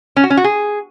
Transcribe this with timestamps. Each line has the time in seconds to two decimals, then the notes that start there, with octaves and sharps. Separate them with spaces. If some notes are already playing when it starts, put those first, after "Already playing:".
0.16 C#4
0.23 F#4
0.30 C#4
0.37 F#4
0.44 G#4